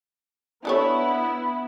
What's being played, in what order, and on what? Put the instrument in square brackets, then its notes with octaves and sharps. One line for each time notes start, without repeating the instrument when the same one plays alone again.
[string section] B3 E4 [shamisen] D4 A4 C#5